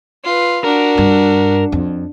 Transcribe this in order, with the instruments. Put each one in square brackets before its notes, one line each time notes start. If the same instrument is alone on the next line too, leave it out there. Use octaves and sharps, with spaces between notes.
[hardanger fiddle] F4 B4
[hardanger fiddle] D4 F#4 [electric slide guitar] A#4
[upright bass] G2
F2